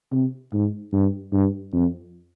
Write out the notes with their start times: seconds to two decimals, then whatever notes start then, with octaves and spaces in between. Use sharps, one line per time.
0.12 C3
0.53 G#2
0.93 G2
1.33 G2
1.73 F2